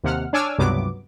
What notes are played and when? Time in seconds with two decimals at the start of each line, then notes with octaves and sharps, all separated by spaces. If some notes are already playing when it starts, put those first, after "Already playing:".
0.04 D#2 C3 F#5 F6
0.33 D4 C#5 G#5 D6 E6 F6
0.58 C#2 G2 C3 F#3 B3 D6